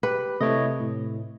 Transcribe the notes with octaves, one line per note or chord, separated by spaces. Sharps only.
G4 B4
C3 A3 E4 C#5 D#5
A2